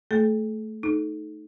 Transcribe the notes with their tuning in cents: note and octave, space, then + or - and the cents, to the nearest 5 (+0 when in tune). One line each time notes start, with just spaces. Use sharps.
A3 +0 A4 -45
D#4 +0 A4 -30